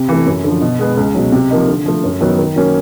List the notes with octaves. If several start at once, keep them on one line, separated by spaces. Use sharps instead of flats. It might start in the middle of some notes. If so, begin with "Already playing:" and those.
Already playing: C3
E3 A3
F#2
D3 F3
B2
G#3 B3
C#2
B2 F#3
C3
F3 A#3 D#4
D3
F3 A3
F#2
D#3 F#3 B3
D#3
F#3 A#3 C#4